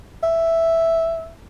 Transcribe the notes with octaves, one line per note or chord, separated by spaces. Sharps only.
E5